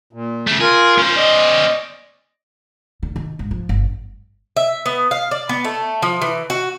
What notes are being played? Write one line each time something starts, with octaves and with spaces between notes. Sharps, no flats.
A#2
C#3 A3
F4 G#4 A#4
C#4 C5
D5 D#5
D3
D#3
G#2
F3
G1
E5
B3
F5
D5
B3
A3
F3
E3
F#4